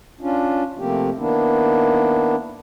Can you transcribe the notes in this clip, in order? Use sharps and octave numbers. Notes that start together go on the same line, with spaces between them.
C#4 D4 F4
C3 F3 A3 A#3 C4 G4
D#3 A#3 B3 D4 E4